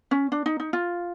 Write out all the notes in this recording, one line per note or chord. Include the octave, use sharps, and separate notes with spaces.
C#4
D4
D#4
D#4
F4